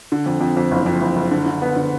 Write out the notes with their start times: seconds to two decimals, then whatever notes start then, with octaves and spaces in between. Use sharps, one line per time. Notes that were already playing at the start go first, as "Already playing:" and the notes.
0.12 D3
0.26 F2
0.41 F2
0.57 F2
0.71 F#1
0.86 F2
1.01 F#1
1.16 F#1
1.31 D3
1.46 D3
1.62 B3
1.76 D3